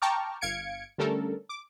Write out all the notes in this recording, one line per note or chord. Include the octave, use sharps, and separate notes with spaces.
G5 A5 A#5 C#6 D6 F6
G1 F5 G#6 C#7 D7
D3 G3 A3 C#4 A4 A#4
D6